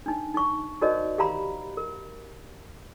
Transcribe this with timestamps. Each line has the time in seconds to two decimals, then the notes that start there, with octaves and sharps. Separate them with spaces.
0.06 D4 D#4
0.34 D#4 C#6
0.81 D#4 F#4 A#4 C5 D5 D#5
1.18 G4 F5 A#5 B5
1.77 A#4